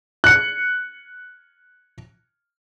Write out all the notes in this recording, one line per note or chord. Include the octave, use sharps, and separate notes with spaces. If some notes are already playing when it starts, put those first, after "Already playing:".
F#6 C#7